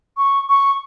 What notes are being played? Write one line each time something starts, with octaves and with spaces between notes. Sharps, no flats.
C#6
C#6